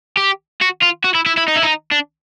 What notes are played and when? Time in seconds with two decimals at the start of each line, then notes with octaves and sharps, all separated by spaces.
0.17 G4
0.61 F#4
0.82 F4
1.04 F#4
1.15 E4
1.26 E4
1.37 E4
1.48 D#4
1.56 E4
1.63 D#4
1.91 D4